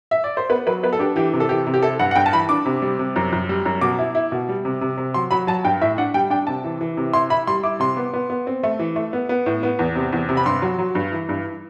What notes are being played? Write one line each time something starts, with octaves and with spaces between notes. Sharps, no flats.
E5
D5
C5
B3 B4
F#3 B4
B3 B4
A4
D4 G4
E3 G4
C3
A4
E3 G4
C3
G4
E4 A4
G2 F#5
F#5
G2 G5
A5
E3 B5
D4 D6
C3
G3
C3
F#2
F#2
G3
F#2
B2 D6
E4
E4
B2
G3
C3
C3
C3
F#3 C6
F#3 B5
F#3 A5
G2 G5
A2 E5
D4 F#5
G3 G5
D4 G5
C3 A5
E3
E3
C3
E4 C6
E4 B5
G3 C6
E4 D6
C3 C6
B3
B3
B3
C4
A3
E3
A3
B3
B3
A2
B3
E2
C3
E2
C3
B5
G2 C6
F#3
F#3
G2
E3
G2